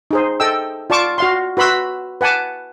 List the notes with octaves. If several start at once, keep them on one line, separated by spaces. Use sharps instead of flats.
D#4 G#4 C5
A4 D#5 G5 E6
F4 D5 A5 C#6 D6
F#4 F5 C6
F#4 B4 B5 C6 E6
B4 F#5 G#5 A5 D6